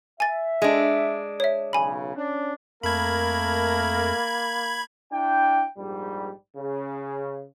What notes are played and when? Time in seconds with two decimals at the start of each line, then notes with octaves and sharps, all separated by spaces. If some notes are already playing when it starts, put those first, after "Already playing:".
0.20 E5 G#5 A6
0.62 G#3 D4
1.40 C#5 E5
1.73 B1 C#3 G#5 B5
2.16 C#4 D4
2.83 F2 A3 A#3 A#4 B5 G#6
5.12 D4 E4 G5
5.77 A#1 G#2 G3
6.56 C#3